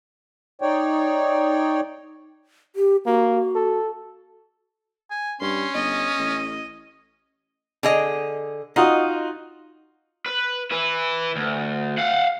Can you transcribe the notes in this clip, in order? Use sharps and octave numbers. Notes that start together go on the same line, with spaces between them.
D#4 C#5 D5 G5
G4
A#3 F#4
A4
G#5
G2 C#4 C6
G1 D#5
A1
D3 G#4 D#5
D#4 F4 F#4 D#5
B4
E4 B4
D2
F5 F#5